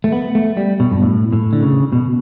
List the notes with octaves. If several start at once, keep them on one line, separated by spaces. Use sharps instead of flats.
A3
B3
A3
G3
B2
G2
A2
A2
D3
C#3
B2